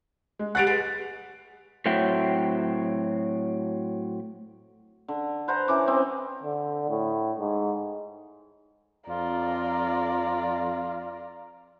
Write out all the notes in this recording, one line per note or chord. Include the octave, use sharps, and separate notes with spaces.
G#3
G3 G#4 F#5 F#6 A6 D7
G#3 B4
A2 F#3 C4 E5 G5
D3
B4 C5 F#5 A#5
E3 C#4 D6
C4 D#5
D3
A2
G#2
F2 F4 D5 A#5